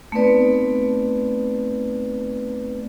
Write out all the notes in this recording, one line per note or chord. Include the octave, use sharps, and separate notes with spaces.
A3 B3 C4 D#4 B4 D5